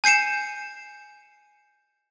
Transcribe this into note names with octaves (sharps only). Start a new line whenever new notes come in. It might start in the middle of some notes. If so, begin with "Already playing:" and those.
G#5 G6 C7 C#7 E7